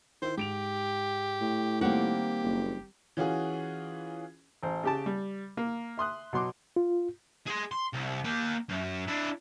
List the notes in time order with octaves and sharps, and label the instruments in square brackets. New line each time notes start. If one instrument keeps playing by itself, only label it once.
[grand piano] D#3 E4 [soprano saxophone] C5
[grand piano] G#2 D7 F7 [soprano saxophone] G4
[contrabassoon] A2
[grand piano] D#3 G3 C4 [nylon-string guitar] A#3 F#5 [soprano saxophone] G4
[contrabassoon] F#1
[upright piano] E3 C#4 F4 F#4 G#4
[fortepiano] A1 C5
C#3 G4 A5
G3
A#3
E5 C6 D#6 F#6
B2 F#3 C6 D6
[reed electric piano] F4
[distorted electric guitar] G#4 C6
C6
C2
A#3 G5
F#2
D4 E4